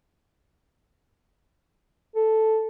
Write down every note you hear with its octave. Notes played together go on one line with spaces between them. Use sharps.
A4